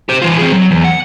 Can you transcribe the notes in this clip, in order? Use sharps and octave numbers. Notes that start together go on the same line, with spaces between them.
G4 C5
E3 F4
C4 G#4
F#3
E2
F#5